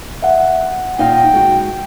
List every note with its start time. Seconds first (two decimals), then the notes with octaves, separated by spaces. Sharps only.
0.22 E5 F#5
0.57 F#5
0.98 A#2 D#4 F5 G5
1.33 G#3 F#4